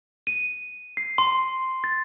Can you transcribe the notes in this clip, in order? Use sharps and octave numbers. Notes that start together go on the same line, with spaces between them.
D#7
C7
C6
A6